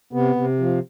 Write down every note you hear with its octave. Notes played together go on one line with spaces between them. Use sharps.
C3 B3
C3
F3